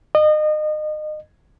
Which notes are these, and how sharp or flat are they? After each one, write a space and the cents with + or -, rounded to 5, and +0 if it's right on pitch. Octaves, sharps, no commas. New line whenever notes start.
D#5 -30